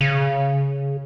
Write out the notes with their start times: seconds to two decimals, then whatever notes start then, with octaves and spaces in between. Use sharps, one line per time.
0.01 C#3